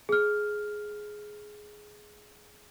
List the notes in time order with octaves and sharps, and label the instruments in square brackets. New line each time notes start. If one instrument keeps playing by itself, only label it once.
[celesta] G#4 F6